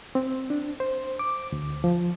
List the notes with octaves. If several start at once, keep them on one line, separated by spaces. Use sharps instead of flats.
C4
D4
C5
D6
D2
F3